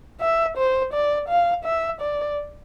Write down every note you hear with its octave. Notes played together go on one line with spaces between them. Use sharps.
E5
C5
D5
F5
E5
D5